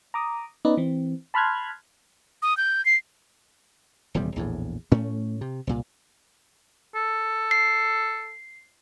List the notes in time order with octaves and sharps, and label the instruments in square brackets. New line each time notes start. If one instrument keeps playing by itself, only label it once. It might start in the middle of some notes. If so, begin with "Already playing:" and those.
[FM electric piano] A#5 D6 D#6
B3 C#4 D#4 B4 D5 D#5
E3 C4
A5 B5 C6 F6 F#6 G#6
[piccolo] D#6
G6
C7
[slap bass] D#1 E2 C3 G3
A#1 E2 A2
A2 A3 C#4
C3
C2 A#2
[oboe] A4
[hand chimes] C7